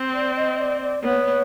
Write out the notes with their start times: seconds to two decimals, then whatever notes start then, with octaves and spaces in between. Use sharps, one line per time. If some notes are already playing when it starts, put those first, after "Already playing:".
Already playing: C4
0.14 D5
0.36 D#5
0.59 D5
0.81 D5
1.03 B3 C#5